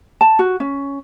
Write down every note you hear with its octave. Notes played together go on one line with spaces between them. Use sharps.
A5
F#4
C#4